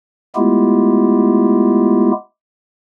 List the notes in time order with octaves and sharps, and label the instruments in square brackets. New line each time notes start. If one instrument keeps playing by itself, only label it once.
[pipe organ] G#3 A3 B3 E4 F4 G4